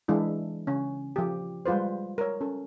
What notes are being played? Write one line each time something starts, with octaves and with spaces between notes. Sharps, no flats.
E3 G#3 D4 E4
C#3 C#4
F3 G4
G3 G#3 F4 B4 C5
A#4 C#5
C#4 A4